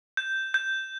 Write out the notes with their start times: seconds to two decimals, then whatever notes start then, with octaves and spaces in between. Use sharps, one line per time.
0.17 G6
0.54 G6